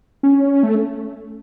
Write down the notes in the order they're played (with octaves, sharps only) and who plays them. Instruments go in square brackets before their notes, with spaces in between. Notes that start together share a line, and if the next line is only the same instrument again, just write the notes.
[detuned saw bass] C#4
A3